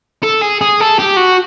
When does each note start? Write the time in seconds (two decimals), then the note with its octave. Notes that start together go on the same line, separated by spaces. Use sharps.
0.23 A4
0.42 G#4
0.61 G#4
0.80 A4
0.99 G4
1.17 F#4